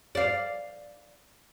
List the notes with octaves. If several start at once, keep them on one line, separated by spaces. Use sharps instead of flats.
D5 F5